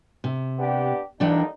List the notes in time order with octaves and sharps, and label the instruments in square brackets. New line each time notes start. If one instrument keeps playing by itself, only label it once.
[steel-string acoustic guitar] C3
[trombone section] B3 D4 G4
[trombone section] D#2 D3 D#4 [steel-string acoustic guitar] E3 D4 G5